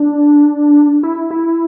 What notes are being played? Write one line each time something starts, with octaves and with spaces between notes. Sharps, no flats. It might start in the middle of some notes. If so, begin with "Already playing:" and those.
Already playing: D4
E4
E4